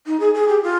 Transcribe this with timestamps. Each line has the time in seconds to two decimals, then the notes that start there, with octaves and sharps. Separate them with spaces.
0.06 D#4
0.20 G#4
0.34 G#4
0.49 G4
0.62 F4